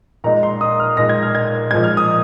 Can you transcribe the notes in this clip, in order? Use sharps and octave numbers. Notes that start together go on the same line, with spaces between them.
A#2 G#3 D#4 A#5
C6
D#6
F6
A#2 G#3 D#4 A#6
G#6
F6
G#6
A#2 F3 G#3 G#6
F6
D#6